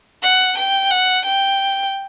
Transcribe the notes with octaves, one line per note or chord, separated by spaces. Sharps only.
F#5
G5
F#5
G5